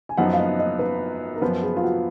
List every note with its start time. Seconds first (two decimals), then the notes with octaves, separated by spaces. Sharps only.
0.09 G#5
0.17 F#2 F3 B3 D#4 F#5
0.33 F5
0.39 D#5
0.59 D#5
0.79 B4
1.36 A#4
1.41 F#2 F3 B3 B4
1.63 G#4
1.77 F4
1.84 F#4